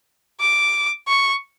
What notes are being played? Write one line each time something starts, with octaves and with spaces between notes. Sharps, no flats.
D6
C#6